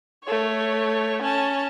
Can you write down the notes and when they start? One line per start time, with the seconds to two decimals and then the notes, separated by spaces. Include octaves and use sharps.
0.24 A3 C#5
1.22 C#4 A5